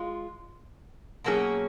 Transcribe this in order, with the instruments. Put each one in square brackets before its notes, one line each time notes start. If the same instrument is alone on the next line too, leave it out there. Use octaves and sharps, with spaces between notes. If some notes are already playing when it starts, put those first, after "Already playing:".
Already playing: [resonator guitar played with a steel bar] G#3 F4
B2 F#3 A#3 C#4 G#4